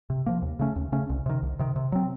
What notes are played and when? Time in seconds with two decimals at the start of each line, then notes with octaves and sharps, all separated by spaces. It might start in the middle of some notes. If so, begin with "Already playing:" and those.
0.10 C3
0.26 F3 A#3
0.42 D#2
0.59 C#3 A3 C#4
0.76 D#2
0.92 C#3 A3 C#4
1.09 C2
1.26 C3 D#3
1.42 C2
1.59 C3 D#3
1.76 C3
1.92 F#3 C4